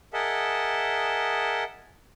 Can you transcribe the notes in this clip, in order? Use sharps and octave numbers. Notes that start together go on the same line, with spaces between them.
G#4 A#4 D#5 E5 F#5 A5